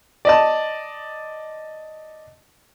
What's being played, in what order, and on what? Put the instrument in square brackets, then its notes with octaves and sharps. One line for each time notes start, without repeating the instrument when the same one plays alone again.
[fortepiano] D5 D#5 A5